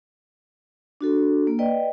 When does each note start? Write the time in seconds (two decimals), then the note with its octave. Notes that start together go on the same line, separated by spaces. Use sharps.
1.01 D4 F#4 A4
1.47 A#3
1.59 B4 D5 D#5 G5